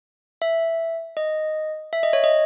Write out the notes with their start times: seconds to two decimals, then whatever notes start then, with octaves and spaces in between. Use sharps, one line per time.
0.42 E5
1.17 D#5
1.93 E5
2.03 D#5
2.13 C#5
2.24 D#5